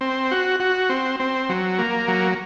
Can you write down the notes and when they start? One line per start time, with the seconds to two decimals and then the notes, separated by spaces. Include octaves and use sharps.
0.01 C4
0.31 F#4
0.60 F#4
0.89 C4
1.20 C4
1.49 F#3
1.79 A#3
2.08 F#3